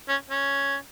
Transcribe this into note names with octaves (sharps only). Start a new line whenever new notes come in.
C#4
C#4